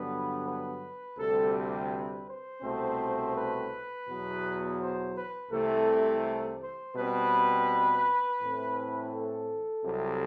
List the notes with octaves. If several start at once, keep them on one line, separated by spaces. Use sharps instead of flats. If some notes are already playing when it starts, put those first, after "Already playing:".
Already playing: G2 D3 F#3 B3 B4
B4
D2 C3 G3 C4 A4
B4
C5
C2 B2 A3 C4
B4
E2 B2 F#3 B3
C5
B4
C2 C3 E3 A3 A4
C5
B2 G3 C4 B4
A2 E3 A3 C4
A4
C2 C3 F#3